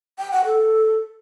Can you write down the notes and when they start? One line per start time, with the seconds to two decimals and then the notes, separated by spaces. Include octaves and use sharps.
0.19 G5
0.32 F#5
0.45 A4